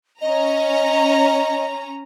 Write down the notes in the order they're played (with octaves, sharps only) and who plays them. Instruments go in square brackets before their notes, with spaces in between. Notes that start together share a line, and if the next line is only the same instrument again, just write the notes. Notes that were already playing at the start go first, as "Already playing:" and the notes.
[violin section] C#4 A#5 [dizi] D#5